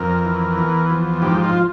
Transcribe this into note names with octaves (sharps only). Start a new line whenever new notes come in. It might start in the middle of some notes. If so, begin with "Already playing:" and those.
Already playing: F2 A#4
E3
E2
F3
G#2 G4
F4